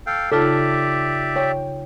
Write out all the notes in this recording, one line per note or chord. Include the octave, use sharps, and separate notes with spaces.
A4 F5 G5
C#3 D#4 F4 G4 A4 D5 E5
C#5 G5